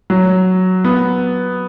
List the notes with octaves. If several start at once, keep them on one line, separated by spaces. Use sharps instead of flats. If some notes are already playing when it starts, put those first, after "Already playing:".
F#3
B3